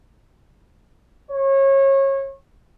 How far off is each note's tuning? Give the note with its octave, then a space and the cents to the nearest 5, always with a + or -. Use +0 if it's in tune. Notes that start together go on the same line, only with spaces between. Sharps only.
C#5 -30